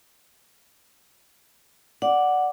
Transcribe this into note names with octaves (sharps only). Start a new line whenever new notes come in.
D5 F#5